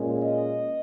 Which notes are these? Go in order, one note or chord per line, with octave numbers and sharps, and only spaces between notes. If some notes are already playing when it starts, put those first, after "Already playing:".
Already playing: A#2 G#3 C#4
D#5